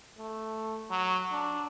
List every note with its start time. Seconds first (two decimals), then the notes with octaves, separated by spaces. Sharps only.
0.18 A3
0.91 F#3
1.32 D4